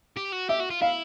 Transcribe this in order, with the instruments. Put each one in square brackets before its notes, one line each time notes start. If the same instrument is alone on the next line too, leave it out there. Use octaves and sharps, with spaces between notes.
[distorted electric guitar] G4
F#4
[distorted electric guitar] G4 [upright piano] E5
[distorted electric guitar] F#4
F4
[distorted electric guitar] E4 [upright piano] F5